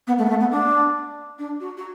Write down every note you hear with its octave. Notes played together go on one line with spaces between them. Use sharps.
B3
A3
B3
A3
B3
D4
D4
F#4
F#4